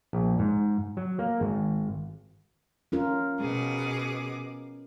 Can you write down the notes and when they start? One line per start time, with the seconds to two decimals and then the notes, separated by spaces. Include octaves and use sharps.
0.13 A#1
0.39 G#2
0.97 F#3
1.19 A#3
1.41 G#1
2.92 C#4 F4 A#4
3.40 B2 G#4 D6